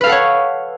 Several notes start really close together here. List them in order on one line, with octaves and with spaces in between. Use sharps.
B4 F5 A4 F#5 C#5